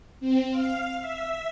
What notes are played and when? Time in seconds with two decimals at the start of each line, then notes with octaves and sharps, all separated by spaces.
0.20 C4
0.51 F5
1.01 E5